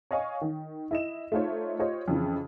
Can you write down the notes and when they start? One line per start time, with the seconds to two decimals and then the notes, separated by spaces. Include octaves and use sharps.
0.11 C#5 D#5 F5 G#5 C#6
0.41 D#3
0.91 E4 D#5 E7
1.32 A3 D#4 F4 C5 C#5
1.79 F4 G4 C5 C#5 D#5
2.08 F2 C#3 E3